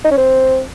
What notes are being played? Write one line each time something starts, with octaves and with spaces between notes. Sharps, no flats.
D#4
C#4
C4